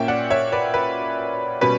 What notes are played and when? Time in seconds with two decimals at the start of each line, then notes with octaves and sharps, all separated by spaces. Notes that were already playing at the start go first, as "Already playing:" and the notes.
Already playing: A#2 A#3 C#4 E5 G5
0.08 D5 F#5
0.30 C#5 E5
0.52 B4 D5
0.74 B4
1.61 B2 G3 C#4 B4